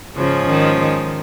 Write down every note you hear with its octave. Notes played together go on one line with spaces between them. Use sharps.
G#2 C#3 F3 G#3 C#4
D#3
D#3